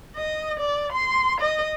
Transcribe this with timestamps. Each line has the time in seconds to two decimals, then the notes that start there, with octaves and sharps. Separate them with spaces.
0.16 D#5
0.59 D5
0.93 C6
1.40 D#5